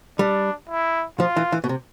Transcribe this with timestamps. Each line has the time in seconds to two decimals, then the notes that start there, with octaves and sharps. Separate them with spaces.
0.19 G3 D4
0.69 E4
1.19 F3 F4
1.36 E3
1.52 E3
1.64 B2
1.69 C3